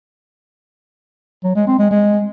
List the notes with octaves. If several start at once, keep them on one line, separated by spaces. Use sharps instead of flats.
F#3
G#3
C4
G#3
G#3